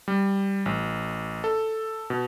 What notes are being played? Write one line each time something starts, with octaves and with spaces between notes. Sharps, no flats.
G3
A1
A4
B2